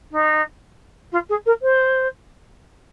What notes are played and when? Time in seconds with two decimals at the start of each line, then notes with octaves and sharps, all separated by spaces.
0.11 D#4
1.12 F4
1.29 G#4
1.46 A#4
1.62 C5